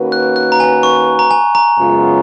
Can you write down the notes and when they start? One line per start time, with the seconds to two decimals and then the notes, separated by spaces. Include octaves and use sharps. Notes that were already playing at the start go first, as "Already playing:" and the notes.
Already playing: D#3 A#3 C#4 F#4 B4
0.12 F#6
0.36 F#6
0.52 A#5
0.60 G#5
0.83 C#6
1.19 A#5
1.31 G#5
1.55 A#5
1.78 F#2 C#3 G#3 B3 F4